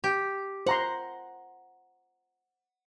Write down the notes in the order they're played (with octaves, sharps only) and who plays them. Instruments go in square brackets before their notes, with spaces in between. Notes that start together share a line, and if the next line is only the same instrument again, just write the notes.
[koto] G4
[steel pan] C5 A#5 C6 [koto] F#5